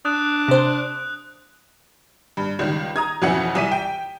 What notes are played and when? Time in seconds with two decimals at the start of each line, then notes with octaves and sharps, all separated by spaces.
0.05 D4 D#6 F#6
0.48 C3 C5
2.37 G2
2.59 C#2 D#3 G3
2.96 A#5 D#6 G#6
3.22 F2 B2 E3 C#4 F#5 C#7
3.55 C2 E3 B6 D#7
3.72 G5